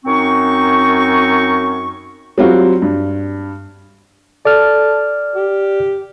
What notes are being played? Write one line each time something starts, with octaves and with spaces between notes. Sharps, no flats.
F#2 C4 D#4 C#6
F#3 G3 C4 F4 F#4
G2
A4 D5 F6
G4